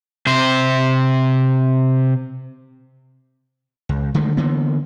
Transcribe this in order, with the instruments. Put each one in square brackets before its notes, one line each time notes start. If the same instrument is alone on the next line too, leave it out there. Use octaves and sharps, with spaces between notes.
[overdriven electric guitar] C3 C5
[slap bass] C#2
D3 D#3 G#3 A3
D3 E3 A#3 B3